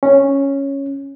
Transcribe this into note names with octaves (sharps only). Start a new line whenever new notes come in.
C#4